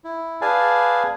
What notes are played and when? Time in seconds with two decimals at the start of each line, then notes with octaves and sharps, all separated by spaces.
0.04 E4
0.41 G#4 B4 D5 F5 G#5 A5